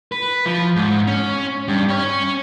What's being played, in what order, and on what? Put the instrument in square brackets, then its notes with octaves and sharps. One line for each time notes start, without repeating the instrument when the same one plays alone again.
[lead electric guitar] B4
F3
G#2
C#4
G2
C#4 C#5